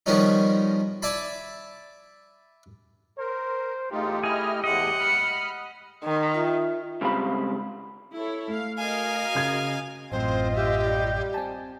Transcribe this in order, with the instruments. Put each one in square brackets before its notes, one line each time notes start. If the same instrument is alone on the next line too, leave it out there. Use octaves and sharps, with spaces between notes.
[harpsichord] D#3 F3 G3 B3 C#4 D#4
D5 E5 G#5 A5 B5
[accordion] A#4 [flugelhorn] C5
[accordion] E2 D#4 F4 [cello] A3 [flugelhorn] G4
[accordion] E4 D#5 F6 [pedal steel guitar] G#4
[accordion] E2 A2 G#3 [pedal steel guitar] D#5 [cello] F#5
[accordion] B5 F6
[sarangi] D#3
[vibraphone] F4 E5
[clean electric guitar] G#2 C#3 G3 C4 F5 B5
[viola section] E4 A4 C#5
[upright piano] A3 [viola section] F5
[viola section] F#4 A#4 D#5 [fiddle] F5 G#5
[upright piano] C#3 G#6
[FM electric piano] A1 F#2 A2 [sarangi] C4 [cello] F4 D#5 [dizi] C5
[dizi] G4 [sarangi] E5
[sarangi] G3
[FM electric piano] C4 G#5 A5